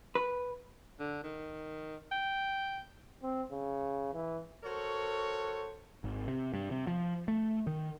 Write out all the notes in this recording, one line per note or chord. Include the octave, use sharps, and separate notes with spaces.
B4
D3
D#3
G5
C4
C#3
E3
F#4 A4 A#4 C5 C#5
G#1
C3
G2
C3
F3
A3
D#3